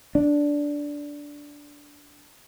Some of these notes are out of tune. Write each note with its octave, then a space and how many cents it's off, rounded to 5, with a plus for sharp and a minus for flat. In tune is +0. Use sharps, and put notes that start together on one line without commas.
D4 -10